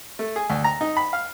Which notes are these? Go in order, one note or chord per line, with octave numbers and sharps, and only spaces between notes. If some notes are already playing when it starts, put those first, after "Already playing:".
A3
G#4
D2
A#5
D#4
B5
F5